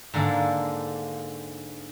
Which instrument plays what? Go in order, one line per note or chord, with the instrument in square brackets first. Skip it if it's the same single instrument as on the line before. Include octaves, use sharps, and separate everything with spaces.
[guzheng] G#2 D3 A#3 A4